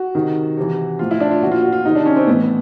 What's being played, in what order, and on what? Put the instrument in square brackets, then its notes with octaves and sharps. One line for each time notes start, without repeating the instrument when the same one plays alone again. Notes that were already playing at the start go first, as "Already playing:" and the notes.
Already playing: [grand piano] F#4
C3 D#3
C3 E3
A2 F3 F4
E4
D4
F4
A#2 F3 F#4
F4
F#4
F4
C3 D#3 D#4
D4
C#4
C4
A2 E3 B3